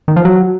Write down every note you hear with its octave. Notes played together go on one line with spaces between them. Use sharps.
D#3
F3
F#3